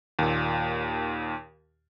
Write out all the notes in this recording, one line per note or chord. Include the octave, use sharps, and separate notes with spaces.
D#2 A#2